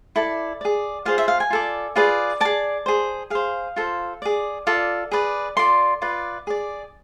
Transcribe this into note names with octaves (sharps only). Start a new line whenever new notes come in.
E4 A4 D5
G#4 D5
F4 G#4 C5 F5
E5
F5
G#5
F4 A4 D5
F4 G#4 B4 D5
G#4 D5 A5
G#4 C5
G#4 C5 F5
F4 A4 C5
G#4 D5
F4 A4 D5
G#4 B4 D5
F4 A4 D5 C6
F4 B4 D5
G#4 D5